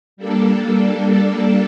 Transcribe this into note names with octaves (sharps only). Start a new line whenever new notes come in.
G3 A#3 D4 A4